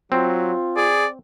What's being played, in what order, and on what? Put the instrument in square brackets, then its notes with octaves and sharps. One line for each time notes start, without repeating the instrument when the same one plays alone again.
[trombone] F#3 [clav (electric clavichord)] C4 [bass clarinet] F4
[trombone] G#4 [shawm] D5